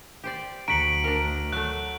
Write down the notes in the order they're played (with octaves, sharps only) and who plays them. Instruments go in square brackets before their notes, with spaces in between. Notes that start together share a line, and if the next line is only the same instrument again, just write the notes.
[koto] G4 C5 D5
[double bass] D2 [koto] F#4 [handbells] A#5 B6 C#7 [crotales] D7 F#7
[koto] D4 A#4
[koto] F#3 A3 [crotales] F#6